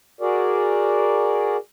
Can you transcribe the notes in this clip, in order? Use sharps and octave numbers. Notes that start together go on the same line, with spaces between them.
F#4 G#4 A#4 D5